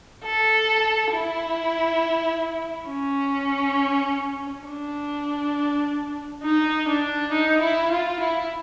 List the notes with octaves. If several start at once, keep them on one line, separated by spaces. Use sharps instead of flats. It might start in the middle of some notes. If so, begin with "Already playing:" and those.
A4
E4
C#4
D4
D#4
D4
D#4
E4
F4
E4